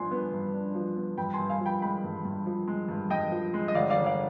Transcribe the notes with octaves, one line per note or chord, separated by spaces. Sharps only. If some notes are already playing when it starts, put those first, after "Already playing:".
Already playing: G2 F3 D4 G#5 C6
B3
G2
D4
F3
B3
G2 G5 B5
G#5 C6
G2
F5 G#5
F3
G5 B5
G#3 G5 B5
G2
G2
F3
G#3
G2
G2 D#5 G5
F3
G#3
D#5
G1 D5 F5
D5 F5
G1
D5 F5